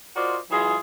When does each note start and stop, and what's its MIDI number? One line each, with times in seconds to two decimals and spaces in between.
0.16 0.37 65
0.16 0.37 66
0.16 0.37 70
0.16 0.37 72
0.16 0.37 74
0.16 0.37 75
0.50 0.77 52
0.50 0.77 54
0.50 0.77 56
0.50 0.77 65
0.50 0.77 68